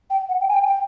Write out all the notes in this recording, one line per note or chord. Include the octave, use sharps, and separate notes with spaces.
G5
F#5
G5
G#5
G5
G5